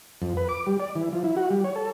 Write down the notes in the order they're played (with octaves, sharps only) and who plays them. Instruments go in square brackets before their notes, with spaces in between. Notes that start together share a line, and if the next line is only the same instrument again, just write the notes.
[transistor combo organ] F2
B4
D6
G3
D5
E3
F3
E4
F#4
G3
C#5
A4